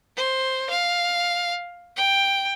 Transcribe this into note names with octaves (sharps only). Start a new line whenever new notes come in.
C5
F5
G5